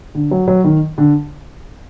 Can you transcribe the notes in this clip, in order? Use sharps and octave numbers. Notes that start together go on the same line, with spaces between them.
D3
F#3
F#3
D#3
D3